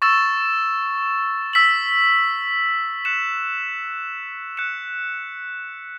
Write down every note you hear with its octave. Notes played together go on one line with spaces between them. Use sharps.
C#6 E6 A6 E7
E6 B6 F#7
F#6 C#7 E7
F#6 C#7 E7